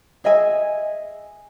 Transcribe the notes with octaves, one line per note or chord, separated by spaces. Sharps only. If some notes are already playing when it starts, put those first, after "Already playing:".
G#4 D#5 E5 G#5